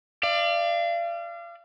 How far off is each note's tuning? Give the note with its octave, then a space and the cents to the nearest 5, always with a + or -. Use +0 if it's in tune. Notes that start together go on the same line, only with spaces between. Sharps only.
D5 +20 F5 -35